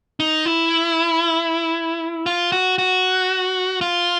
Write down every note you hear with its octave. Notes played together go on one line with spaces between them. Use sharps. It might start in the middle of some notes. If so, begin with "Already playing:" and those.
D#4
E4
F4
F#4
F#4
F4